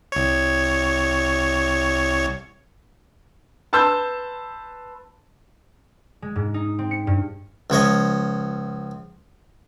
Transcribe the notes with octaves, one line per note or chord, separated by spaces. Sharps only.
C2 C#5
B4 A5 C6 E6 G6
G#3
G#2
D#4
C4
C#7
G2
C#2 F3 C#5 D#5